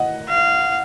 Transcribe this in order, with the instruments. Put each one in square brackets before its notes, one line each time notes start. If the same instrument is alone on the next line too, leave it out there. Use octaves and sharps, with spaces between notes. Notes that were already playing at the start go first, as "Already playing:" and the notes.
Already playing: [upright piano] D#5 F#5
[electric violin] F5